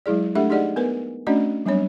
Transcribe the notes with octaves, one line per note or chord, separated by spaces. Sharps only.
F#3 G#3 E4 G#4 D5
A3 D4 G4 A4 E5 F#5
D#4 G4 G#4 D5 D#5 F#5
B3 A#4 B4 G#5
A3 C#4 D4 F#4 D5 D#5
F#3 G3 B3 C4 D4 C#5